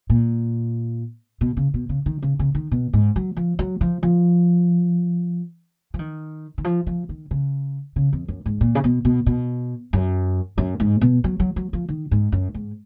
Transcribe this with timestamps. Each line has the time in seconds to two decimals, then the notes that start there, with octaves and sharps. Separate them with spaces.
0.10 A#2
1.41 B2
1.57 C#3
1.74 B2
1.89 C#3
2.06 D#3
2.22 C#3
2.39 C#3
2.55 D#3
2.71 B2
2.93 G#2
3.16 F#3
3.36 F3
3.59 F#3
3.81 F3
4.03 F3
5.94 F3
5.99 D#3
6.58 D#3
6.64 F3
6.87 F3
7.09 D#3
7.31 C#3
7.96 C#3
8.13 F2
8.28 F#2
8.46 G#2
8.61 A#2
8.75 C#3
8.84 B2
9.05 B2
9.26 B2
9.93 F#2
10.58 F#2
10.80 G#2
11.01 B2
11.24 F#3
11.40 F#3
11.56 F#3
11.73 F3
11.88 D#3
12.11 G#2
12.32 F#2
12.54 G#2